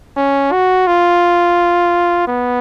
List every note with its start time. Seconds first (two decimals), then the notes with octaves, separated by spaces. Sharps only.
0.17 C#4
0.52 F#4
0.87 F4
2.27 B3